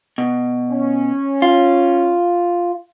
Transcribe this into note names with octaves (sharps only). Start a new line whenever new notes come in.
B2
C#4
F4